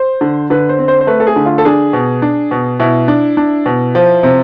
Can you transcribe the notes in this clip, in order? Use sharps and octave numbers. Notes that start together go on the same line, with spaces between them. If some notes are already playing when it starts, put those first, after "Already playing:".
Already playing: C5
D3
D3 B4
C5
C4
C5
C5
A3 B4
A4
G#4
D3
F4
A4
D4 G#4
B2
D4
B2
B2 E4
D4
D4
B2
F3
C3